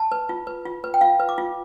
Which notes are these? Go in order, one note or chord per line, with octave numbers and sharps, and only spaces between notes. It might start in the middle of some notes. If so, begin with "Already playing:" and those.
Already playing: A5
B4
F4
B4
F4
B4
G5
F4 F5
B4
D6
F4